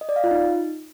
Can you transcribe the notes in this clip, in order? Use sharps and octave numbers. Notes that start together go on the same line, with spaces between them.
D#5
D5
F5
F4
D#4